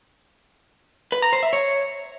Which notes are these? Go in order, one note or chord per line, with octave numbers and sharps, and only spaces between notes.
B4
A#5
C5
E5
C#5